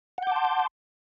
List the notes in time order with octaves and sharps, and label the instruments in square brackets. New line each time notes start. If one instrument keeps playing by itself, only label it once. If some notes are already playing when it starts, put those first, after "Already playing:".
[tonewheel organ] F#5
G6
D6
A5
C6